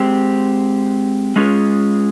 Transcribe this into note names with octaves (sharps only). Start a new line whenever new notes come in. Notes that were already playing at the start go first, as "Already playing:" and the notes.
Already playing: G#3 C4 G4
G#3 C#4 F4 G#4